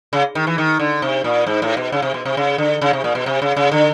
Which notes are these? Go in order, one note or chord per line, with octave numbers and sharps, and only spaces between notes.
C#3
D#3
E3
D#3
D3
C3
A#2
G#2
A2
B2
C#3
C3
B2
C3
C#3
D3
C#3
C3
A#2
B2
C3
C#3
C#3
D3